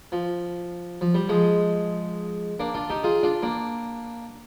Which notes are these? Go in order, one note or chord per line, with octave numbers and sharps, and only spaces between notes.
F3
F3
G3
F3 G#3
A#3 D4
D4 F4
D#4 G4
F4 G#4
D4 F4
A#3 D4